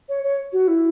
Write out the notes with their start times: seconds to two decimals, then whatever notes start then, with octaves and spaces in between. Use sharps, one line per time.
0.08 C#5
0.23 C#5
0.52 F#4
0.67 E4